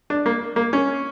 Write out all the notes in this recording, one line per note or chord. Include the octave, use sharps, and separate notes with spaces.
D4
A#3
A#3
C#4